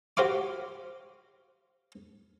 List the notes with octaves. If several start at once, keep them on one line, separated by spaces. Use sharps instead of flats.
F#4 G4 C5 F5 D6